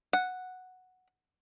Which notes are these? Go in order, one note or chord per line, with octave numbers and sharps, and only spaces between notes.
F#5